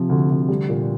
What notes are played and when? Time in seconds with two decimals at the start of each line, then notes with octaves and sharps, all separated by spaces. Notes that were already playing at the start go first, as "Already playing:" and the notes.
Already playing: C3 F3
0.09 D2
0.29 D2
0.49 G3
0.69 A#2